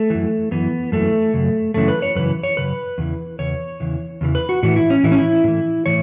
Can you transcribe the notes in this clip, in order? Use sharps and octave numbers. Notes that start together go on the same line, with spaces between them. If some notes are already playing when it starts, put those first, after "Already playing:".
Already playing: A3
F#2 E3
F#2 E3 B3
F#2 E3 A3
F#2 C#3
F#2 C#3 E3 A3
B4
C#5
F#2 C#3 E3 B4
C#5
F#2 C#3 B4
E2 C#3 E3
E2 C#3 C#5
E2 C#3 E3
E2 C#3 E3
B4
F#4
A2 E3 F#4
E4
C#4
A2 E3 E4
C#4
E4
A2 E3
A2 E3 C#5